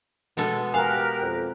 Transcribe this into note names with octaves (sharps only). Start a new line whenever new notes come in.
B2 G#3 B3 A4
G4 A#4 F5 G#5 F#6
F2